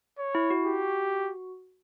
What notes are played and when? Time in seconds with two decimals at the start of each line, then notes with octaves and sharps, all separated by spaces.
0.18 C#5
0.35 E4
0.50 F#4
0.66 G4